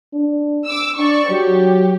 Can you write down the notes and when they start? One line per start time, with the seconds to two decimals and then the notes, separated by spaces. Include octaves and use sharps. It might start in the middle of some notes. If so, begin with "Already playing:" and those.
0.13 D4
0.66 D6 E6
0.98 D4 D5 C#6
1.30 F#3 G4